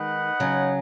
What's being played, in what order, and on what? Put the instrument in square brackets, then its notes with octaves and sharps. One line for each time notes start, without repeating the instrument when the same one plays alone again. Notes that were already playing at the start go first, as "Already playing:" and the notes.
Already playing: [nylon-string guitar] D#3 G#3 [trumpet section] D#4 B4 F#5
[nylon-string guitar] C#3 F#3